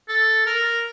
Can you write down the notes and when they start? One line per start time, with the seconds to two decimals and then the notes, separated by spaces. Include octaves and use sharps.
0.08 A4
0.46 A#4